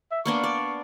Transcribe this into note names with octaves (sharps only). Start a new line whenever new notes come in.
E5
A#3 B3 D4 C#6
D5